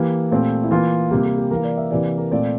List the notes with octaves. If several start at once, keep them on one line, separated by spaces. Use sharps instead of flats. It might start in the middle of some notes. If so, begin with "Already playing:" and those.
Already playing: E3 A#3 G4
A#2 A3 C4
E4
E3 A#3 F4
C3 G3 A#3 G4
G4
G4
E3 A#3 A#4
D5
E5
C3 E3 A#3 D5
A#4
A#2 A3 C4 D5